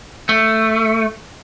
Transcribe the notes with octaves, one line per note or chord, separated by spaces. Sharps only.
A3